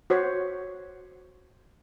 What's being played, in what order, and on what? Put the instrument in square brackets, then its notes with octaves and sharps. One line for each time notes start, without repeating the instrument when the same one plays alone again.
[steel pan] F#4 C5 C#5